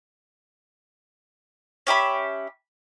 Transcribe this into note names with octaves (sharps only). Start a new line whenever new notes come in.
C#4 G4 E5 B5